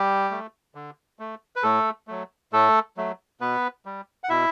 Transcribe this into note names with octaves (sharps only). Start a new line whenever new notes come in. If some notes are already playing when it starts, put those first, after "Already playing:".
Already playing: G3 G4
A3
D3
A3
B4
A2 A3 A4
F#3 A3
A2 A3 A4
F#3 A3
B2 B3 B4
G3
F#5
B2 E4 E5